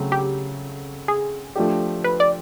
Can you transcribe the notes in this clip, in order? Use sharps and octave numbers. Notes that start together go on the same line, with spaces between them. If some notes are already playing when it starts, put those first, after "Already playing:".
Already playing: C#3 F#3 A3 C4
G4
G#4
F3 A3 D4 G4
B4
D5